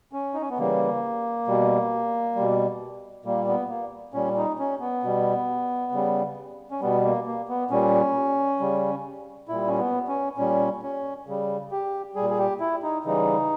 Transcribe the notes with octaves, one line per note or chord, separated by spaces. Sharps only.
C#4
D#4
C#4
B3
C#3 E3 G3 A#3
B2 G3
B2 G3
A#2 G3 A#3
B3
A#3
A#2 G3 C#4
D#4
C#4
B3
B2 G3
C#3 G3
C#4
B2 G3 B3
A#3
A#3
B3
A#2 G3 C#4
C#3 G3
A#2 G3 E4
C#4
B3
C#4
A#2 G3 C#4
C#4
C#3 G3
G4
A#2 G3 G#4
G#4
G4
E4
D#4
C#3 E3 G3 D#4